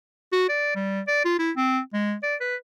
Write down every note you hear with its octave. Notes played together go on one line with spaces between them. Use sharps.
F#4
D5
G3
D5
F4
E4
C4
G#3
D5
B4